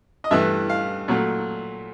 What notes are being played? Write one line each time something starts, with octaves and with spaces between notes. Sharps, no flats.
D#5
G2 E3 A3 E5
F5
A#2 F#3 A3